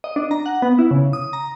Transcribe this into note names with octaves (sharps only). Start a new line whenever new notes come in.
D#5
D4
A#5
F#5
B3
E4
C#3
D#6
A#5